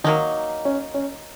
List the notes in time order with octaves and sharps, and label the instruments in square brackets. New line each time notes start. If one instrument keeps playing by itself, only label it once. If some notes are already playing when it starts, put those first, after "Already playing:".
[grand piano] D#3 [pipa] F#3 A#3 D#4
[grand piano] C#4
C#4